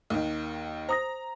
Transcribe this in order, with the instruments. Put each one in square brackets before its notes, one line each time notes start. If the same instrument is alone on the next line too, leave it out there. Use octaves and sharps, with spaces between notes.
[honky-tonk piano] D#2 D#3
[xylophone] C5 D#6 A#6 [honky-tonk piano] A#5